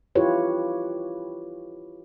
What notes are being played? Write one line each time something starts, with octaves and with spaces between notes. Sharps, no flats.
E4 F4 G4 B4 C#5